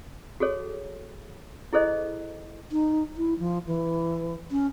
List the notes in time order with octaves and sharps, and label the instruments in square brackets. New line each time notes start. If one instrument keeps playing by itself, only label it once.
[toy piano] F#4 G#4 A4 C#5
E4 G#4 A4 C5 D#5
[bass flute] D#4
E4
F3
E3
C#4